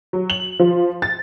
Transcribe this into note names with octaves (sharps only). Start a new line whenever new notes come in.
F#3
F#7
F3
A6